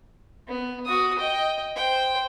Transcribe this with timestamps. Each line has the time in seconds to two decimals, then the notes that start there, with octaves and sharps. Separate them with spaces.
0.47 B3
0.86 F#4 D#6
1.18 D#5 G5
1.76 C5 G5